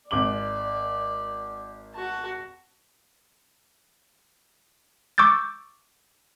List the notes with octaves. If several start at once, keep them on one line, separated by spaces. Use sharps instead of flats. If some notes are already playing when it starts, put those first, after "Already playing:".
G#1 D5 D6 F#7
F#4 A5
C#6 D6 E6 G6 A6